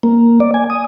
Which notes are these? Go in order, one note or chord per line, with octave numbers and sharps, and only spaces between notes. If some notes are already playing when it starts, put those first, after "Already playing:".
A#3
D5
G#5
D#6